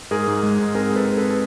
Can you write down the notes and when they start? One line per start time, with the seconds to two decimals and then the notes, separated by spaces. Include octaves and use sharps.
0.11 G#2 G#4 A#4
0.27 G#2
0.43 G#3
0.59 G#2
0.75 C4 G#4 A#4
0.91 G#3
0.96 A4 B4
1.07 C4
1.17 A4 B4
1.30 A4